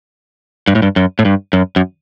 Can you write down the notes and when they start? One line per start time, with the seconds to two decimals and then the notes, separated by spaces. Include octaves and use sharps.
0.68 G2
0.75 A2
0.82 G2
0.96 F#2
1.19 A2
1.25 G2
1.53 F#2
1.76 F#2